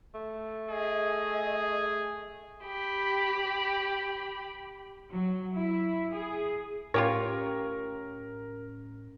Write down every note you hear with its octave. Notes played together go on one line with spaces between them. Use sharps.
A3
G#4 D#5
G4 B5
F#3
E4
G#4
A2 C#4 F4 G4 A#4 C#5